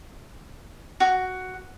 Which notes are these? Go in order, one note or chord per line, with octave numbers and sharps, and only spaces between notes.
F#4